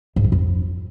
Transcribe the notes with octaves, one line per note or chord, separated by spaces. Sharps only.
G#2
F3
F2